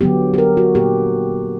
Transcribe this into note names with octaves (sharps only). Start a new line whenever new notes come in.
D3 F#3 B3 G4
G4
A#4
F#4
A#2 A#3 G4